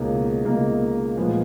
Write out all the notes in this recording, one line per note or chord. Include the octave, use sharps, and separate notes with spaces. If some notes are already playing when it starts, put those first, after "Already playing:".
Already playing: C#2 B2 A#3 D#4 A#4
C#2 B2 A#3 D#4 A#4
A#2 F3 G#3 B3